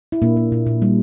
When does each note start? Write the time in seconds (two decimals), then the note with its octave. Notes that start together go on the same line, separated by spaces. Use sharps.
0.12 E4
0.22 A#2 A#3 D4
0.37 A#3
0.52 A#2
0.67 A#2
0.82 G3